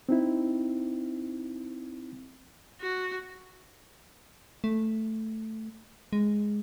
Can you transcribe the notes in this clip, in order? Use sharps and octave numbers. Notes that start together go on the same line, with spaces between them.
C4 D#4 E4
F#4
A3
G#3